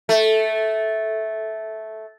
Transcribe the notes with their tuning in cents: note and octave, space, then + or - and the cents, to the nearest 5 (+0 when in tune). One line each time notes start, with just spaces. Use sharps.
A3 -10